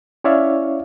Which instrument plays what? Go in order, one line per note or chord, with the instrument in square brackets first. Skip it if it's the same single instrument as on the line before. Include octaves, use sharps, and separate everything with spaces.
[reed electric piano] C#4 E4 C#5 D5 E5 F5